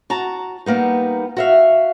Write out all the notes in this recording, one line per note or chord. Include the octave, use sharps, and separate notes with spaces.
F#4 A5 A#5
G3 A#3 B3 D#4
F#4 E5 F5